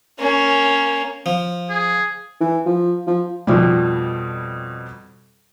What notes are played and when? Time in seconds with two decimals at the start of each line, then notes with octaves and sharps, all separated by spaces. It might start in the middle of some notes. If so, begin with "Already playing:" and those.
0.19 A#3 C#4
1.26 F3
1.70 G#4
2.41 E3
2.66 F3
3.07 F3
3.47 F2 B2 F3 G3